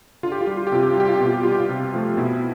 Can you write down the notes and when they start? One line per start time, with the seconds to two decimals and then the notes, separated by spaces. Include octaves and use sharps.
0.23 D3 F4
0.32 G4
0.41 F4
0.47 G3 G4
0.57 F4
0.67 G4
0.72 C3 F4
0.83 G4
0.92 F4
0.97 G3 G4
1.09 F4
1.18 B2 G4
1.26 F4
1.34 G4
1.43 G3 F4
1.52 G4
1.60 F4
1.69 C3
1.94 F3 A3
2.17 B2 E4